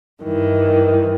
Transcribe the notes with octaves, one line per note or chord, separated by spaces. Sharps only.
G2 D#3 E3